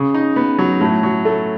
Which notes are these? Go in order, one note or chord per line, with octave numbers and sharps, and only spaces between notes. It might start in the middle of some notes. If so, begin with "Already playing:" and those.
Already playing: C#3
D#4
B3
F#3
A2
F#3
A3